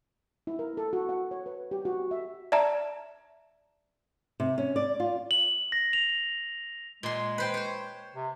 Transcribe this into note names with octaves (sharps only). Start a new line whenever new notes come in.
E4
A#4
A4
F#4
F#5
C#5
B4
G4
F#4
E5
D5 E5 A5 A#5
C3
C#4
D5
F4
F#7
A#6
F7
A#2 G#3 C6
B4 C5 G5
C5 C#5
C3